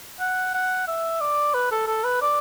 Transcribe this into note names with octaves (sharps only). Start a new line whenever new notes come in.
F#5
F#5
E5
D5
B4
A4
A4
B4
D5